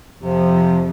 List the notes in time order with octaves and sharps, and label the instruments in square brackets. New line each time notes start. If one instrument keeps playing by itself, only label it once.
[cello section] F2 [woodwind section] C3 F3